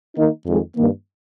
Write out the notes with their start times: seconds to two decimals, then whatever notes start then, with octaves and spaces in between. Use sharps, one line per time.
0.16 D#3 A#3 D#4
0.46 F2 D#3 G#3
0.76 G2 D#3 A#3